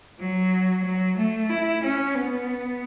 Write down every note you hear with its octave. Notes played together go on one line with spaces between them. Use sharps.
F#3
F#3
A3
E4
C#4
B3